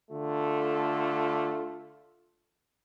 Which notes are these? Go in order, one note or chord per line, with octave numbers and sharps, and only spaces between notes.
D3 A3 F4